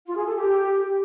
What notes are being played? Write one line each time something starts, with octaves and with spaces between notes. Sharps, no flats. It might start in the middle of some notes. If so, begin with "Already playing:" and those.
F4
G#4
A4
G4